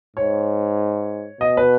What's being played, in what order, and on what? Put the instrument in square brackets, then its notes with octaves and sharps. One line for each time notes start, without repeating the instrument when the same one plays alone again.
[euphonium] G#2 [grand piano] C#5
[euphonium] B2 [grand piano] D#5
[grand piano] B4